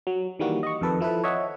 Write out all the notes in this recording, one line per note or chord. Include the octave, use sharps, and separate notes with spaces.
F#3
D#3 E3 G3 A#3 F#4
D#5 C#6
F2 D#3 A4 B4
F3 E4 A4 B4
C#5 D#5 E5 F#5